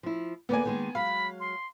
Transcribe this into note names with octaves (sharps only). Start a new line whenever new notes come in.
F3 E4
D2 A#3 B3 D5 G#5
D#3 G#3 A#3
F#3 G#3 F5 B5
C6